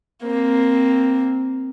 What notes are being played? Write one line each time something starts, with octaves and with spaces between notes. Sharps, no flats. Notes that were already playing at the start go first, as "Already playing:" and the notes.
A#3 C4